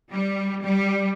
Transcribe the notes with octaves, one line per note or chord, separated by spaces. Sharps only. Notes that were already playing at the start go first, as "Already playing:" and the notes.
G3
G3